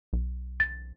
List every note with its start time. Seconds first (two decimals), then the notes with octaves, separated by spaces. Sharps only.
0.13 B1
0.60 A6